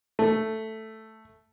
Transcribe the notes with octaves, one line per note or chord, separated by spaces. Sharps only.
A3